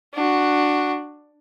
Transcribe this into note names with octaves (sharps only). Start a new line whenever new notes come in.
D4 F#4